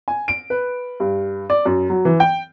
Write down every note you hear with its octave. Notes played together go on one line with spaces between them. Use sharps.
G#5
D7
B4
G2
D5
F#2
F#3
E3
G5